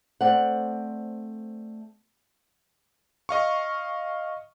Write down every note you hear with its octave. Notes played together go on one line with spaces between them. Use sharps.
A3 C4 C5 D5 F#5
D#5 F5 C#6